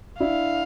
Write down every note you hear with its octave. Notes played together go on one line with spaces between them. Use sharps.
D4 E4 F5